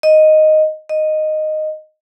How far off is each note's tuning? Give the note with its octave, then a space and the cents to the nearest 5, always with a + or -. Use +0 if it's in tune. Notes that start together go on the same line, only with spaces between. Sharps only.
D#5 -5
D#5 -10